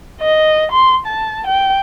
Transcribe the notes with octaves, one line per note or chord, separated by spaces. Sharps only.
D#5
C6
A5
G5